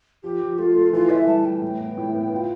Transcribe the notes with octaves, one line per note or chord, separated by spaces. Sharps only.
F3 G4
F3
A3 F4
A3
E3 F4
E3 E5
G3 A5
E3 G5
A2
B3
A2
B3
F4